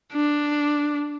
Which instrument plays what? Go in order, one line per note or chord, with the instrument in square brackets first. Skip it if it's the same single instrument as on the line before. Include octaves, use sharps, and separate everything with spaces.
[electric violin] D4